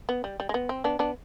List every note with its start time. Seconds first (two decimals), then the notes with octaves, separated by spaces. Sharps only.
0.09 B3
0.24 G3
0.40 G3
0.49 G#3
0.54 B3
0.69 C4
0.84 B3 D4
0.99 B3 D4